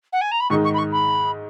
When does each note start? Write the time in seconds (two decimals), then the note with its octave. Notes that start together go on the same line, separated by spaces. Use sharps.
0.13 F#5
0.21 G#5
0.32 A#5
0.40 B5
0.50 G#2 D#3 G#3 D#4 C#6
0.65 C#6
0.74 B5
0.78 C#6
0.92 B5